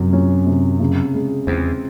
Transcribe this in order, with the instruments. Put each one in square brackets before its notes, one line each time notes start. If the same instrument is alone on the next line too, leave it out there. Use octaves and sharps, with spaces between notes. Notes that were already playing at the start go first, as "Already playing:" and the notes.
Already playing: [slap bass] F#2 [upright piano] C3 F#3
[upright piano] C#4
C3
C#3
G#3
[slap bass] E2 [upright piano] C4